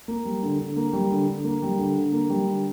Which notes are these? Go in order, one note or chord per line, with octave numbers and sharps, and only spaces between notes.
A#3
G3
D3
D3
A#3
G3
D3
D3
A#3
G3
D3
D3
A#3
G3
D3